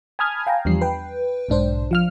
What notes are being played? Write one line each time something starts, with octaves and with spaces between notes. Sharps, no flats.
G#5 A5 B5 D#6 F6 G#6
F5 G5 G#5 A#5
E2 F3 G3 D4 C7
B4 G5
B1 G#2 D4 C5
F3 F5 F6